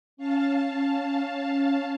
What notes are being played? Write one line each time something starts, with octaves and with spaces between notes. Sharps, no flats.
C#4 F5 A5